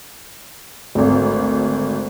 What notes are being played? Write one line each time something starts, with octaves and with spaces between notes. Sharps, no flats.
G#1 D2